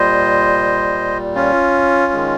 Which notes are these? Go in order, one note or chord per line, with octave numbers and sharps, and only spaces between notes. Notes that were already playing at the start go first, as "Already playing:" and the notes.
Already playing: A#2 G3 C5 D#5
C#4 F4
D#3 G#3